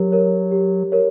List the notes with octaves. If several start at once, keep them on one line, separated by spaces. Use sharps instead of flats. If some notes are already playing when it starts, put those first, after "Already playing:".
Already playing: F#3 G4 A#4 C#5
A#4 C#5
G4
A#4 C#5